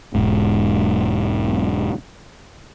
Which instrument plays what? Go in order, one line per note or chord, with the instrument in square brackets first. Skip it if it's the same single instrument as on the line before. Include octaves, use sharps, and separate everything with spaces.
[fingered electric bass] E1 G#2